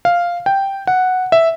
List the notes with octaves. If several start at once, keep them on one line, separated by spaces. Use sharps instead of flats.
F5
G5
F#5
E5